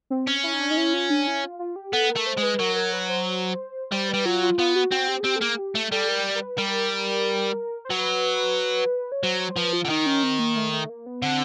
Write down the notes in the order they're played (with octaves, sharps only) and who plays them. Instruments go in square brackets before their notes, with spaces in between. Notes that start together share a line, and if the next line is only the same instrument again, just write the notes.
[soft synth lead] C4
[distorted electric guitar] C#4
[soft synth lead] E4
D#4
D4
D#4
E4
F4
D4
E4
F4
F4
G4
[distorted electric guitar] B3 [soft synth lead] A4
[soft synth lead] A#4
[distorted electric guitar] A3
[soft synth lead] C5
[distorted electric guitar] G#3
[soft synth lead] B4
[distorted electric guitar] F#3 [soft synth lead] A#4
[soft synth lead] A#4
B4
C5
[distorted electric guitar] G3 [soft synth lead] C5
[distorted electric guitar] G3 [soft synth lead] B4
[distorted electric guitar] F#3 [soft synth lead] F4
[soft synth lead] F4
[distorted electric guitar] B3 [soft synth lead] F4
[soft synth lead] F#4
[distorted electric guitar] C4 [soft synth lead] F#4
[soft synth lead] G4
G#4
[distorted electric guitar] C4 [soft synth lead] G4
[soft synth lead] A4
[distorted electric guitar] A#3 [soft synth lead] G#4
[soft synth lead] G4
[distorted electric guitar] A3
[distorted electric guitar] G3 [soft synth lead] A4
[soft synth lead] A#4
A#4
B4
[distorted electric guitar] G3 [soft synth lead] A#4
[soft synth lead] C5
[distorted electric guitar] F#3 [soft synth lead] B4
[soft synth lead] C#5
[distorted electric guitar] F#3 [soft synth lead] C5
[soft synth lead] C5
[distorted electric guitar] F3 [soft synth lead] B4
[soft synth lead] F4
[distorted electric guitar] D3
[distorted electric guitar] D#3 [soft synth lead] D#4
[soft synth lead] C#4
C4
A#3
A3
A3
A#3
B3
[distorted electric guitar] D3 [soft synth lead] C4